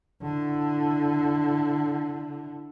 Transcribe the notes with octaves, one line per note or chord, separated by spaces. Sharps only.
D3 E4